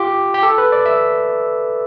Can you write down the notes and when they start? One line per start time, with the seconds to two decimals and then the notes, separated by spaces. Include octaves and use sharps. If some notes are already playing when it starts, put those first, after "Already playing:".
Already playing: F4 G4
0.34 G4
0.43 A4
0.58 B4
0.72 D5
0.86 E5